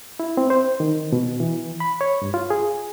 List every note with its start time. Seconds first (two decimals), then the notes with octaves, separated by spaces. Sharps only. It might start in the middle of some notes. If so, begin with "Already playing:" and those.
0.20 E4
0.37 C4
0.50 C5
0.80 D#3
1.13 B2
1.40 E3
1.80 B5
2.01 C#5
2.22 G2
2.34 F4
2.50 G#4